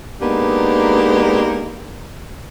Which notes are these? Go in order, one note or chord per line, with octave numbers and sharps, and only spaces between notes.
G#3 A#3 B3 D4 D#4 G4